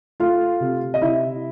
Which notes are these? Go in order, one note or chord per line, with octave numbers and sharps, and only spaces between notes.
A3 F4 F5
C3
D#5
C3 E4 E5